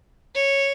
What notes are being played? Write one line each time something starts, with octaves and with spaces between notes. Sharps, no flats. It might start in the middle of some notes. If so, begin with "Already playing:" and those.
C#5